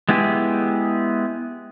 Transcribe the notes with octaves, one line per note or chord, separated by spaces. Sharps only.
G#3 B3 E4 G4 G#4